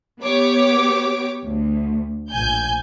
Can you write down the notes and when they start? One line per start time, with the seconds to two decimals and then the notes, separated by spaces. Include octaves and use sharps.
0.23 B3 G4 C#5 D6
1.46 D2
2.30 A#1 G#5 G6